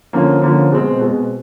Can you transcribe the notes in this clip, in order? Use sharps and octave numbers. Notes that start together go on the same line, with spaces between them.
D3 F3 A#3 C#4
D3 F3 A#3 C#4
B2 G#3 C4
B2 G#3 C4